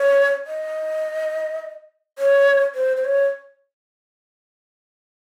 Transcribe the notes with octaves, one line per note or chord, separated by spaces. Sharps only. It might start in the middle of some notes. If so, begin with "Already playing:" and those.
Already playing: C#5
D#5
C#5
C5
C5
C#5